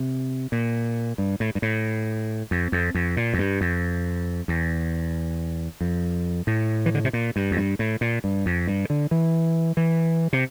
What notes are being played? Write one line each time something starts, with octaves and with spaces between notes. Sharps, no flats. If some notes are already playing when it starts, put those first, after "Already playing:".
Already playing: C3
A#2
G2
A2
G2
A2
F2
F2
F2
A#2
F2
G2
F2
E2
F2
A2
E3
D3
C3
A#2
G2
F2
G2
A2
A#2
G2
F2
G2
D3
E3
E3
C3